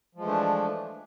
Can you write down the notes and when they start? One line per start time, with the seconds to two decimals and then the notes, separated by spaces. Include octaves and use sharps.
0.15 F3
0.18 G#3
0.21 E3
0.24 A3
0.27 D4